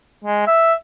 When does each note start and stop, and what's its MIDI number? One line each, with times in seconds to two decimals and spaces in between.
0.24 0.45 56
0.47 0.74 76